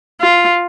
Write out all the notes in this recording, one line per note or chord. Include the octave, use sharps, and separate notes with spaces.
F4